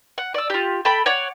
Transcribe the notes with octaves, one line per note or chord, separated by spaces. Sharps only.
F#5
D5 E6
F4 G4
A4 G5 B5
C#5 D5 F#5